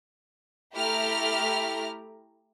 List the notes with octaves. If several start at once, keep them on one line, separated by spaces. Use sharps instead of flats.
A3 E4 G4 A#5 F6